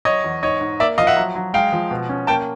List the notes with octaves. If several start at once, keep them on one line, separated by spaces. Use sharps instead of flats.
F#3 C#5 D#5
E2
G#2 C#5 D#5
G#2
A#3 D5 E5
F3 D#5 F5
E5 F#5
F#3
F#3
G#3 F5 G5
F3
B2
C#4
A#3 G5 A5